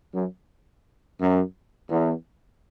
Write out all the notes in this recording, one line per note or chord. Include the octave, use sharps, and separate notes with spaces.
F#2
F#2
E2